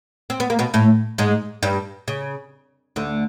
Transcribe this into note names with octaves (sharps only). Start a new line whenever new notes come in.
C4
B3
A#3
B2 B3
A2 A3
G#2 G#3
G2 G3
C#3
D2 D3